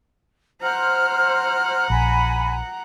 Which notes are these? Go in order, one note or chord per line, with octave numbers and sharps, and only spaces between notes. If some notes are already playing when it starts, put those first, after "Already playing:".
C5 F#5 A#5 F6
A#1 G#5 B5